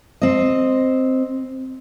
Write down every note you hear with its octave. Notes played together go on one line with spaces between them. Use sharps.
C4 D#5